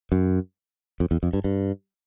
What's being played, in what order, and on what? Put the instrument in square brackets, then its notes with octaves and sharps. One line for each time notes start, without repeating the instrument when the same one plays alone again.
[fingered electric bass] F#2
F2
E2
F2
G2
G2